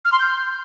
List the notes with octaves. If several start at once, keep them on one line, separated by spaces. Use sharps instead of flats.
F6
C6
G6